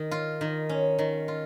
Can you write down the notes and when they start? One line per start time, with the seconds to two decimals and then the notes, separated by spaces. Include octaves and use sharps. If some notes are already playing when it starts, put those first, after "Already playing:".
Already playing: D#3
0.11 F4
0.41 D#3
0.69 C#4
0.99 D#3
1.28 F4